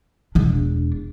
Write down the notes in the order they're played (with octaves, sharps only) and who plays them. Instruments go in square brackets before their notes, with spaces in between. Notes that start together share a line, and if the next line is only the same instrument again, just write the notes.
[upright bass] E1 D4